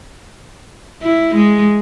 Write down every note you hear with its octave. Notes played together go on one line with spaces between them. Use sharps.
E4
G#3